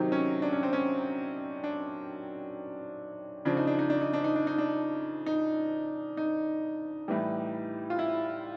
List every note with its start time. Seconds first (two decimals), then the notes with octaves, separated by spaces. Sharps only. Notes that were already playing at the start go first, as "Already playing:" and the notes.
Already playing: C3 D#3 F#3 D#4
0.12 C#4
0.42 D4
0.52 C#4
0.63 C4
0.73 C#4
1.64 D4
3.45 C#3 F3 D4
3.57 D#4
3.67 D4
3.79 D#4
3.90 D4
4.01 D#4
4.13 D4
4.24 D#4
4.36 D4
4.47 D#4
4.58 D4
5.26 D#4
6.17 D#4
7.08 A2 E3 G3
7.90 F4
7.99 E4